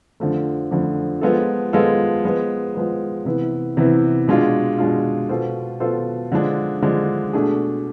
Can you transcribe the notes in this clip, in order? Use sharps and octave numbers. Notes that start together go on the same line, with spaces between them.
F2 D3 F3 A3
F2 D3 F3 A3
F3 G#3 B3 F4 A4
F3 G#3 B3 F4 A4
F3 G#3 B3
F3 G#3 B3
C3 E3 B3 E4
C3 E3 B3 E4
B2 G#3 D4 F4
B2 G#3 D4 F4
B2 B3 F4 A4 C5
B2 B3 F4 A4 C5
D3 F3 G#3 D4
D3 F3 G#3 D4
B2 A3 D4 G#4